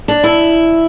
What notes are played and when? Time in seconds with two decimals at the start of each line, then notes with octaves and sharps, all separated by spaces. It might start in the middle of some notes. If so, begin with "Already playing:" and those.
0.08 D4
0.24 E4